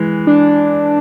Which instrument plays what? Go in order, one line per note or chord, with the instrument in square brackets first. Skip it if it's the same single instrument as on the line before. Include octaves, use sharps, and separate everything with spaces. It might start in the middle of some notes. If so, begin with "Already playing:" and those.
Already playing: [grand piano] E3 G#3
[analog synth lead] D4